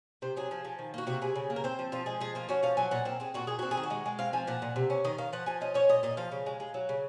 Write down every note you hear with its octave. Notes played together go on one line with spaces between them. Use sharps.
C3 C5
F#3 G#4
F3
F3
D#3
A#3 F#4
C3 F#4
C3 G#4
C#3
A#3
A#4
C4 C5
F3
F3 F4
G#3 G#4
F3 G#4
A#3 F4
C#4 F#4
F3 F5
F#3 G#5
A#2 F#5
C4 A#4
C4 G#4
A#2 F#4
A#2 G#4
C4 F#4
G#4
D#3
F#4
G#3
G#3
C4 F5
F3 G#5
A#2 F#5
A#2
C3
C#4
D#3 D#5
D#3 F5
F3 F#5
F3 G#5
C#4 D#5
C#4 C#5
A#2 D#5
A#2 D#5
F3 F5
C#3
G#3
G#3
F#3
C#3